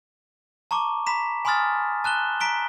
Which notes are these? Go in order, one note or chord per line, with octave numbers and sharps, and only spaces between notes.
A5 A#5 C#6 D6
A#5 B5 B6 E7
G#5 B5 C6 D#6 F6 A6
A5 F#6 E7 G7
A#5 B6 D7 G7